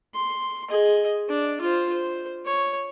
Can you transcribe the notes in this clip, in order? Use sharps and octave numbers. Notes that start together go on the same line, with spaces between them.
C6
G#4 D#5
D4
F4 C5
C5
C#5